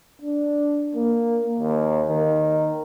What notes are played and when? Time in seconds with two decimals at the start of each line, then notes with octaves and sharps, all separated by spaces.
0.22 D4
0.95 A#3
1.60 D#2
2.08 D#3